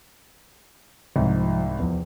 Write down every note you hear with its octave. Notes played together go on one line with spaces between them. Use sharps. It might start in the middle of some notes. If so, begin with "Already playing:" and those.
C2 G#2 F3
E2 F3